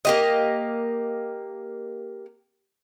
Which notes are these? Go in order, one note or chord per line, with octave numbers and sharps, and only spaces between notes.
A#3 G4 D#5